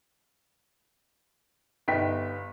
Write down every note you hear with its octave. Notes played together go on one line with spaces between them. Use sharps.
G1 B3 D#4 G5 B6